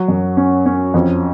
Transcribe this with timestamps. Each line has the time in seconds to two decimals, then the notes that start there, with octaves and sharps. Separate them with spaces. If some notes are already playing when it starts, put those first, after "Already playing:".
Already playing: F#3
0.08 F#2
0.37 C#4
0.66 C#4
0.94 F2